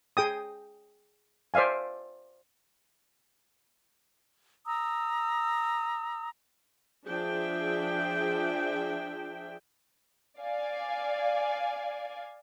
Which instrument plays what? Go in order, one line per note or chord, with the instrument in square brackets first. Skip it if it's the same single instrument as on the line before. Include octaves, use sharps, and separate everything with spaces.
[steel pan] G#4 G5 D#6
C5 D5 E5 F5 G#5
[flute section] A#5 D#6 E6
[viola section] F3 D4 G#4 E5 G5
[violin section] D5 F5 G#5